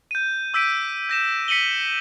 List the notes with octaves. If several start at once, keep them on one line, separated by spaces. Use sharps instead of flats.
G6 D#7
D6 E6 G6 B6 D7 D#7
G6 A#6 E7
B6 C#7 D#7 F#7 G7